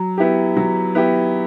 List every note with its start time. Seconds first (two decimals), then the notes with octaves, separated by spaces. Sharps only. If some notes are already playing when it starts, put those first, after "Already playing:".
Already playing: F#3
0.18 B3 E4 G4
0.57 F#3
0.95 B3 E4 G4